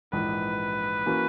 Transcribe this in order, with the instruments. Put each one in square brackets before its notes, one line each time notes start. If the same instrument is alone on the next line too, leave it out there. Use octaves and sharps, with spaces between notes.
[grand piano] A#1 G#2 E3 [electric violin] B4
[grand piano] E3 A#3 C#4 F#4